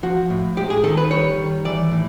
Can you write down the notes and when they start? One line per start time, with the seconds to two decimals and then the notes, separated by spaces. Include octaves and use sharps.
0.03 F3 F#4
0.30 A2
0.57 G#3 G4
0.70 G#4
0.83 D#3 A4
0.97 B4
1.11 G3 C#5
1.38 D#3
1.65 E3 D5
1.91 A2